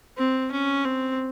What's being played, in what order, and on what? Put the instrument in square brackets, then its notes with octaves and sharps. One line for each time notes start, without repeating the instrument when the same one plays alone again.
[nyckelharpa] C4
C#4
C4